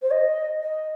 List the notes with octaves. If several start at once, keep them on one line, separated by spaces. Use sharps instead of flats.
C5
D#5
D#5